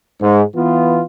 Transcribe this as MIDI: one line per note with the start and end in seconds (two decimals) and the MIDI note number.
0.20 0.43 44
0.56 1.04 52
0.56 1.04 59
0.56 1.04 65